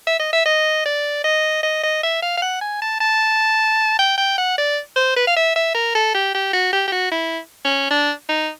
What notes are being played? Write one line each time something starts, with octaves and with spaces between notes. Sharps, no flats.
E5
D#5
E5
D#5
D5
D#5
D#5
D#5
E5
F5
F5
F#5
G#5
A5
A5
G5
G5
F#5
D5
C5
B4
F5
E5
E5
A#4
A4
G4
G4
F#4
G4
G4
F#4
E4
C#4
D4
D#4